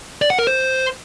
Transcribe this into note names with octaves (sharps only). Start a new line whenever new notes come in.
D5
F#5
A#4
C5